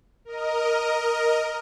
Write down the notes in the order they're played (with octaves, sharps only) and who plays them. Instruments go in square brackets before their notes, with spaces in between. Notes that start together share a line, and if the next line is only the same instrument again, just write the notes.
[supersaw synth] A#4 D#5